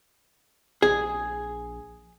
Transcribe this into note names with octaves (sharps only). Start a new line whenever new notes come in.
A#1 G#4